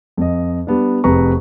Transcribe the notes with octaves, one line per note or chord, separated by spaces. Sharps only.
F2 D#5
G3 B3 D4
F1 F2 G#4 B4 A#5 C#6